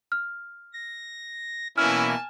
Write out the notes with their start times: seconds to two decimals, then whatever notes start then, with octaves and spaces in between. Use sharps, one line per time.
0.12 F6
0.73 A#6
1.78 B2 E3 A#3 C#4 E4 G#5 A5 F6